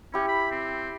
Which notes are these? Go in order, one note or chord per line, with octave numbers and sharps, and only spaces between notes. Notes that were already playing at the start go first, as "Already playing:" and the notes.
C#4 E4 G4
B5
C4